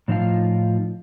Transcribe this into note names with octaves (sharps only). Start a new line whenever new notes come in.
A2 F3 D#4 F4 F5